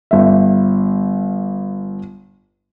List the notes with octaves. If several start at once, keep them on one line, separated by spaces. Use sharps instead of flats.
G1 E5